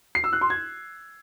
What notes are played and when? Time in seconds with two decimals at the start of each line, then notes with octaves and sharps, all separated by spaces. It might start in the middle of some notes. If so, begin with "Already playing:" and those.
0.15 C7
0.24 E6
0.33 F#6
0.41 C6
0.50 G#6